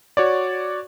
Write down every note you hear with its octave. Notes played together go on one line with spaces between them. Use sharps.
F#4 C#5 D5